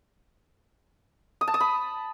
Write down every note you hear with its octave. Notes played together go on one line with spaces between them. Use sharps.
D#6
A5
D#6
B5